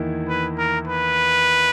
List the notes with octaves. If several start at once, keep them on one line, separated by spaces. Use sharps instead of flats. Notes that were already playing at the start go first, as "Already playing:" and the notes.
Already playing: E2 D#3 A#3 E4
B4
A#4
B4